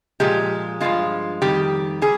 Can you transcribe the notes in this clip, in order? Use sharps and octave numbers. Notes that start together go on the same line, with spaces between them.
A#2 F3 G#3 G4
G2 F3 G#3 F4
F2 D#3 G3 G4
G3 G#4